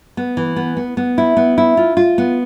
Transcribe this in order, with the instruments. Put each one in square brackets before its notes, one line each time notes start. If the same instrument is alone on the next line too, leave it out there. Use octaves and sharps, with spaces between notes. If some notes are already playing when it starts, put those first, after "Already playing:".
[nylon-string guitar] B3
E3
B3
B3
B3
E4
B3
E4
F4
F4
B3